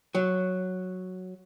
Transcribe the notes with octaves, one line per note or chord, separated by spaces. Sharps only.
F#3